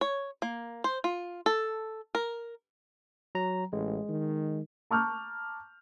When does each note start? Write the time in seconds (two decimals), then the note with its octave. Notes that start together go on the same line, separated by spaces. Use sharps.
0.01 C#5
0.42 A#3
0.84 C5
1.04 F4
1.46 A4
2.15 A#4
3.35 F#3 A#5
3.73 A1 G#3
4.09 D#3
4.91 A5 A#5 C#6 D6 F6 G6